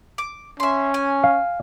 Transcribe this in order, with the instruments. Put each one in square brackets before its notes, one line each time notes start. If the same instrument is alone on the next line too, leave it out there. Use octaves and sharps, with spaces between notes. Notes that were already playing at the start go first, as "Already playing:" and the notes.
[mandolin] D6
[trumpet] C#4 [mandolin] E5 C6
[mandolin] G#5
[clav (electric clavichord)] F5